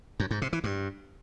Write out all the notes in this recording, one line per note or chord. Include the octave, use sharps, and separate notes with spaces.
F#2
G#2
C3
E3
G2